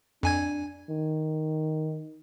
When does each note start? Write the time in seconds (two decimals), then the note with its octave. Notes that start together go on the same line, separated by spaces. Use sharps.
0.23 F2 D4 G#5 G#6
0.89 D#3